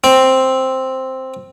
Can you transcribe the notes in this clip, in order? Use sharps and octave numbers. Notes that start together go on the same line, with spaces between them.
C4